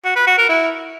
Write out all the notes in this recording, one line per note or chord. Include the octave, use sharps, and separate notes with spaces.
F#4
B4
F#4
A#4
E4